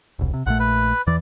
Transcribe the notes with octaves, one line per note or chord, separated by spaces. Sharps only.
E1 C2
C3
A#1 A#2 A3 F#5
B4
E2 E3 D5